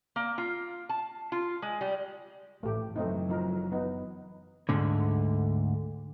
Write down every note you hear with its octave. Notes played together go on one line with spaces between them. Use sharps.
A#3
F4
A5
F4
G#3
G3
A1 A3 G4
F#1 E3 F#3 A3 C4 D#4
F3 D#4 A#4
B3 D#4
D2 G#2 D3